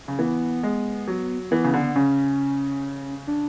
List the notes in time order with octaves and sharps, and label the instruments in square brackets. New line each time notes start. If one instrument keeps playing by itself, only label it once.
[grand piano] C#3
[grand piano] E3 [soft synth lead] B3
[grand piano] G#3
F#3
[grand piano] E3 [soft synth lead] B3
[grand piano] C#3
D3
[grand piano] C#3 [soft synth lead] C#4
[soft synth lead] D4